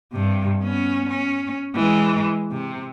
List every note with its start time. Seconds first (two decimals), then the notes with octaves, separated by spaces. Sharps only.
0.13 G2 C3
0.63 B3 C#4
1.09 C#4
1.75 E3 G#3
2.52 C3